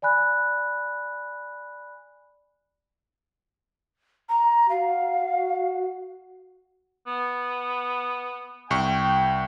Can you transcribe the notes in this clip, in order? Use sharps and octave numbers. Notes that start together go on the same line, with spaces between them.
D5 G#5 B5 F#6
A#5
F#4 F5
B3
C2 G5 C#6